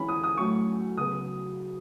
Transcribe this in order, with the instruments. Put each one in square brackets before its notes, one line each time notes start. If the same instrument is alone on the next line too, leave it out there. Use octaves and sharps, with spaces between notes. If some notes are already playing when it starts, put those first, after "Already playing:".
Already playing: [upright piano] E3 G#3 C#4 B5
D#6
D#6
A2 F#3 A3 C#4 C#6
C#3 F#3 B3 D#6